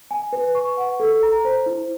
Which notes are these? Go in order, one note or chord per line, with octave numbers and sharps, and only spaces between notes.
G#5
B4
C#6
F#5
A4
A#5
C5
E4